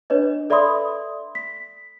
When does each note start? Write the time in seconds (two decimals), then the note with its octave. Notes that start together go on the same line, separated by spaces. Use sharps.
0.10 D4 B4 C#5 D#5
0.50 A4 D5 E5 B5 C6 D#6
1.35 B6